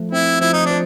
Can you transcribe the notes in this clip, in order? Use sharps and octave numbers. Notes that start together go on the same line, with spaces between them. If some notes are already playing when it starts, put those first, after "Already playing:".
Already playing: F3 A3
C4 E4
F3 E4
D#4
F3 D4